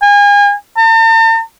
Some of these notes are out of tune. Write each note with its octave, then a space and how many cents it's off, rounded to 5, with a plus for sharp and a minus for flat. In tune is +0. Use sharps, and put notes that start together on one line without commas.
G#5 -35
A5 +45